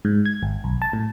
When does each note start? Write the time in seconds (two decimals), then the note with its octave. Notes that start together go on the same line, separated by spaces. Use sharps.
0.05 G#2
0.26 G#6
0.43 G#1
0.64 B1
0.82 A5
0.93 A2